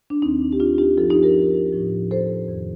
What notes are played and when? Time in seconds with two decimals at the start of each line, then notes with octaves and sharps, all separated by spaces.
0.10 D4
0.22 D#2 D#3 C4 D#4
0.53 G4
0.60 D4 F4
0.78 D#4 G4
0.97 G2 F3 F4 A4
1.10 D#4 G4
1.23 G4 A#4
1.73 A2 F3
2.11 A4 C5
2.48 F2 D#3